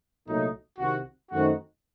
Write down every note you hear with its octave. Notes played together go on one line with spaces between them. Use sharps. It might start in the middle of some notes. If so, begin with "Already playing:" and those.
C2 A#2 F#3 A3 D#4
C2 C3 D#3 F#4
F#2 D#3 A3 C4 D#4 F#4